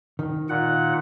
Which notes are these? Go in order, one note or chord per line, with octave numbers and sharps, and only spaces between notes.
D#3
A#2 F#5